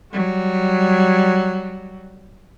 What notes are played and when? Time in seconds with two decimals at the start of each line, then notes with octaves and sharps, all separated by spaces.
0.12 F#3 G3